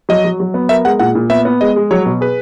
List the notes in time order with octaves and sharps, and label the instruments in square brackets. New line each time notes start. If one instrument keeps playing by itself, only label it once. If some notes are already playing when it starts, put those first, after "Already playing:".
[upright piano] F#3 [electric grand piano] D#5
[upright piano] F#3
F#3
B3
[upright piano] A#4 [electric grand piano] E5
[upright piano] G#3 [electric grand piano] F#5
[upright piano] A#2 [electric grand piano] F#5
[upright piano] A#2
[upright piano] B3 [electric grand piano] E5
[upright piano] B3
[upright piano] G#3 [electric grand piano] D#5
[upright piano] G#3
[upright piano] F#3 [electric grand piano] C#5
[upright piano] B2
[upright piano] G#4 [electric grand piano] B4